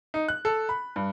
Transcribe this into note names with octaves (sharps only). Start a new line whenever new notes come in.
D#4
F#6
A4
B5
G2